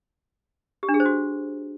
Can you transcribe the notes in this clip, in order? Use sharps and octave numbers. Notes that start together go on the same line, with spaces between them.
G4
D4
G#4
C5
F#4